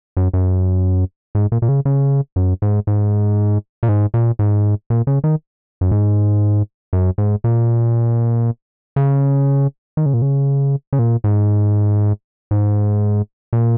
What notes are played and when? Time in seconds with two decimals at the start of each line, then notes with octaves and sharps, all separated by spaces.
0.17 F#2
0.33 F#2
1.35 G#2
1.52 A#2
1.62 A#2
1.69 C#3
1.85 C#3
2.36 F#2
2.62 G#2
2.87 G#2
3.83 A#2
3.89 G#2
4.14 A#2
4.39 G#2
4.90 A#2
5.07 C#3
5.24 D#3
5.81 F#2
5.92 G#2
6.93 F#2
7.18 G#2
7.44 A#2
8.96 C#3
9.97 D#3
10.06 C#3
10.14 A#2
10.22 C#3
10.93 C#3
10.99 A#2
11.24 G#2
12.51 G#2
13.53 A#2